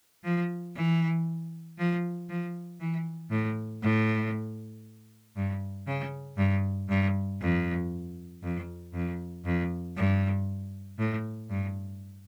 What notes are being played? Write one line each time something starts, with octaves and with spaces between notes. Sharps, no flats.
F3
E3
F3
F3
E3
A2
A2
G2
C#3
G2
G2
F2
F2
F2
F2
G2
A2
G2